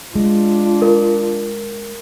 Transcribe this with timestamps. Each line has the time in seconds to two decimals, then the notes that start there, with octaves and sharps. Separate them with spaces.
0.15 G#3 D4 F4
0.82 A#4